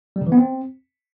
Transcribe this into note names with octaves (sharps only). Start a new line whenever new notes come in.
G3
C#3
E3
B3
C4